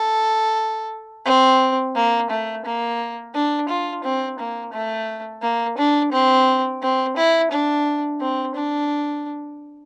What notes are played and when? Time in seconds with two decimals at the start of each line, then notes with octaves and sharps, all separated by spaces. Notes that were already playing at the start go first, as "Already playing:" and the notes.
Already playing: A4
1.26 C4
1.96 A#3
2.30 A3
2.65 A#3
3.35 D4
3.68 F4
4.04 C4
4.39 A#3
4.73 A3
5.42 A#3
5.77 D4
6.12 C4
6.82 C4
7.16 E4
7.51 D4
8.20 C4
8.55 D4